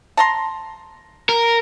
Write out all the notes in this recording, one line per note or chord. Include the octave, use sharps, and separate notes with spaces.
A5 A#5 C6
A#4